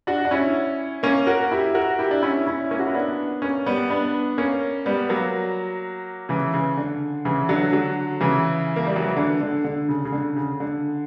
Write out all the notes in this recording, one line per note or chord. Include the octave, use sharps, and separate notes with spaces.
D4 F#4
D4
C#4 E4
A#3 C#4
F#4 A#4
E4 G4
F#4 A#4
E4 G4
D4
C#4 E4
C#4 E4
A#3 C#4
F#4
E4
B3 D4
A#3 C#4
G3 B3
B3 D4
A#3 C#4
G3 B3
F#3 A#3
C#3 E3
C#3
D3
C#3 E3
D3 F#3
D3 F#3
C#3 E3
A#3
G3
F#3
E3
D3
D3
D3
C#3
C#3
D3
C#3
D3